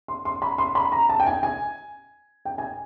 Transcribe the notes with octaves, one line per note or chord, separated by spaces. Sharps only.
C6
C6
B5
C6
B5
A#5
A5
G5
G#5
G#5
G5
G#5